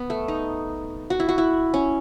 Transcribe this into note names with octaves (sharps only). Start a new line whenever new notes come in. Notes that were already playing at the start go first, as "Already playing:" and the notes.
Already playing: B3
A3
D#4
F#4
E4
F#4
E4
C#4